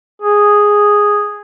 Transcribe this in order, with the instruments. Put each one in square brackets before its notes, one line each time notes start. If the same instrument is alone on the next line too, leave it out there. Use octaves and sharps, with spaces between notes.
[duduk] G#4